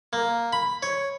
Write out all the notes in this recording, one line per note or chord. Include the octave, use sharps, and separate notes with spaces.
A#3
B5
C#5